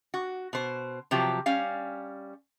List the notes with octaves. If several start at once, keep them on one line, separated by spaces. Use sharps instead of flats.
F#4
B2 C5
C3 F3 F#3 G4
G3 C#4 F5